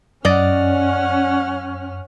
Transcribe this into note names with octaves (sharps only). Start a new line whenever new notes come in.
F#2 C#4 D5 D#5 F#5 F6